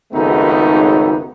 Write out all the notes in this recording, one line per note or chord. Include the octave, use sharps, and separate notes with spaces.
G#1 C#2 F#2 A3 B3 D#4